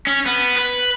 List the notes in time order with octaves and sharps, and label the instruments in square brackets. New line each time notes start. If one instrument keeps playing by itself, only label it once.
[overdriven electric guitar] C#4
B3
B4